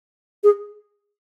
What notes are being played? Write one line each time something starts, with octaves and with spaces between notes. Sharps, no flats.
G#4